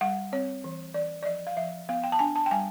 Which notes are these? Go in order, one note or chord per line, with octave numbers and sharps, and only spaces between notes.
G3 F#5
C4 C#5
E3
E3 D5
D5
F3 D#5
F5
F3 E5
B3 F5
G5
A5
D4 G#5
A5
G5
G3 G#5